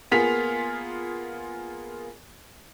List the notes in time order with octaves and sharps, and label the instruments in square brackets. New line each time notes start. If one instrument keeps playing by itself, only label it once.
[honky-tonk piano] A#3 B3 F4 G#4 B6 F7